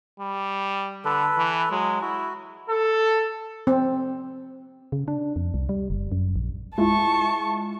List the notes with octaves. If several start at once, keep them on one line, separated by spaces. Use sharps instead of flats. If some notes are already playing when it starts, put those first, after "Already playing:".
G3
D3 A4 B4
E3
F#3 G#3
E4 F#4
A4
C4
C#3
D4
F2
C2
G3
F#1
F#2
A#1
G#3 E4 F4 A5 C#6